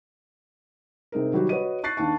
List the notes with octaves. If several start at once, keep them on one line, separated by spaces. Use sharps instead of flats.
C3 G#3 D#4 A#4
D#3 F#3 G3 F#4 G4
F#4 B4 C#5 D#5 D#7
C#6 F#6 A6 C7
D#2 D4 A5 C#6